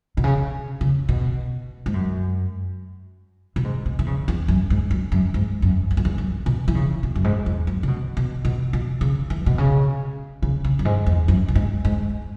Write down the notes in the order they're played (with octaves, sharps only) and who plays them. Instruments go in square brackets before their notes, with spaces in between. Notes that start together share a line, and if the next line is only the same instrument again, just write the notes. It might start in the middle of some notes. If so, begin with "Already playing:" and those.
[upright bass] B2
C#3
C#3
B2
G#2
F#2
B2
G#2
B2
E3
C#3
E2
F#2
G#2
F#2
F#2
G#2
F#2
E2
F#2
E2
F#2
B2
E3
C#3
B2
F#2
G#2
E2
F#2
C#3
B2
B2
B2
B2
C#3
E3
B2
C#3
C#3
C#3
F#2
G#2
E2
F#2
B2
G#2
G#2